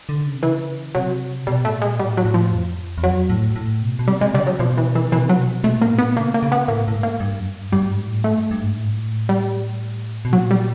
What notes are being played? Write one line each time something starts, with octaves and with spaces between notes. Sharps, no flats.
D3
C#3
C3
C#3 E3
C3 F#3
B2 G3
A2 A3
A#2
G#3
A2 G3
F#3
A2
F3
F2
E2
F2 F#3
A2
A2
B2
B2
C3 G3
C3 G#3
C#3 G3
F#3
B2 F3
E3
E3
B2 E3
C3 F#3
B2
B2 A3
A#2
A#3
A2
A#2 B3
C#3 A#3
A#3
C#3
B3
A2 A#3
A2
G#2
A#3
G2
F#2
G2
G2 G3
G#2
A2
G#2 A3
G2
G2
G#2
A2
G#2
A2
G3
B2
A#2 F#3
G3